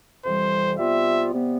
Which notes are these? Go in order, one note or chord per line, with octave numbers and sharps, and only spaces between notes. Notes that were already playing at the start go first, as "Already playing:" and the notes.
F2 C3 E3 G3 C5
C3 G3 B3 F4 E5
C3 G3 B3